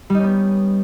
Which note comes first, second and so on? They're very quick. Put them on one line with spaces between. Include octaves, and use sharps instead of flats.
G3 D#4 C#4 B3